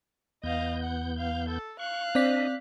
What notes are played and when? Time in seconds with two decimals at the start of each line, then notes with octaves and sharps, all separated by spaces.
0.43 E2 B3 D#5 F5 G6
0.84 F#5
1.18 F5
1.49 A4
1.79 F5 C#6 F#6
2.15 C4 D4 D5 D#5 B6